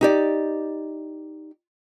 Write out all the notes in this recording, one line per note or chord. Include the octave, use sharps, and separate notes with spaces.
D#4 G4 D5